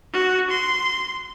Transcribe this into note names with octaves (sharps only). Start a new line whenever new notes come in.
F#4
C6